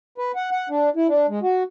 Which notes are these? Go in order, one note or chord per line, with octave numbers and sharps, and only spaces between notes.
B4
F#5
F#5
D4
E4
D4
G#3
F#4